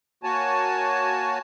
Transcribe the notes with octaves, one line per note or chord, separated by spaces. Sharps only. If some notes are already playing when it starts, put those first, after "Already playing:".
A#3 F#4 C#5 G#5 A5